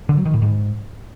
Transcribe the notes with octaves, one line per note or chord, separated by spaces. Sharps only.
D3
F#3
D#3
A2
G#2